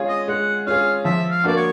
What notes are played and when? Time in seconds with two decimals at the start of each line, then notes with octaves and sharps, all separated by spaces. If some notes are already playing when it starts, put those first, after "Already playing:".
Already playing: G#3 C#4 F4 G#4
0.09 D#5
0.28 G#3 F#5
0.67 C#4 F4 G#4 F5
1.05 F3 E5
1.31 F5
1.44 A#3 D4 F#4 D5
1.56 C#5